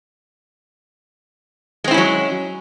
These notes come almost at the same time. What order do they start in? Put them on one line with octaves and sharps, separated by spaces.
G#3 C4 E4 C#4 F#3